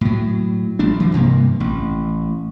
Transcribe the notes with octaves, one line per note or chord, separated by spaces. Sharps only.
A2 F#3
A1 F#3 D4
E3
G2 C3 A#3
A1